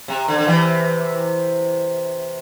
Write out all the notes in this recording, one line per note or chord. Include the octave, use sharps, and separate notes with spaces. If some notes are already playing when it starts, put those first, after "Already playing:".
C3
D3
D3
C3 E3